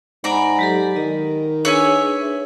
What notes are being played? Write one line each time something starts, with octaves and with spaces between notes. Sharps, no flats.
G#2 D5 F#5 G#5 A#5 B5
F#3 G4 A4
D#3 D#5
D4 G#4 B4 C#5 E5 G#5